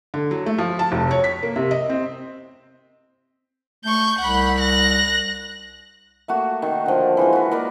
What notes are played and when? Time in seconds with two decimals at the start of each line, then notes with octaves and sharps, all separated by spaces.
0.14 D3
0.31 F#3
0.46 A3
0.58 F3
0.79 A5
0.92 F1
1.11 C#5
1.24 B6
1.43 A#3
1.56 C3
1.71 D#5
1.90 C4
3.84 A3 C#6 G6
4.18 C2 F#5 B5
4.59 F#6 A#6
6.28 A3 A#3 F#4
6.62 D#3
6.86 D3 F3
7.17 E3 G#3 F4
7.33 F#4 B4
7.51 A#3 A#4 B4 D5